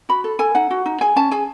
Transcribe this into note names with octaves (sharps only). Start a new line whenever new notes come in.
F#4 B5
A4
A4 G#5
D#4 F#5
F#4
D#4
G#4 G#5
C#4 A5
G#4 G#5